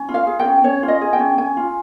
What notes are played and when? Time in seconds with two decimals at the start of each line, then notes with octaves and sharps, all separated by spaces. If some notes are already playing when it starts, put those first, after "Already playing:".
Already playing: C#4
0.09 F4
0.14 F5
0.27 G#4
0.39 G5
0.45 C#4
0.64 C#4 C#5
0.83 F4
0.88 D#5
1.01 G#4
1.13 G5
1.19 C#4
1.38 C#4 G#5
1.57 F4